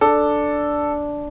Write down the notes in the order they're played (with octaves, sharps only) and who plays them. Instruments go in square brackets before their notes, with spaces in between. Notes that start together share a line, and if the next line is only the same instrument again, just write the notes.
[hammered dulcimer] D4 [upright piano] A4